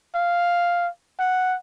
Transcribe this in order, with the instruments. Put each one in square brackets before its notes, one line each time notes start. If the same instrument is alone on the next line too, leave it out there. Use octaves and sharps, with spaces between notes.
[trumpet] F5
F#5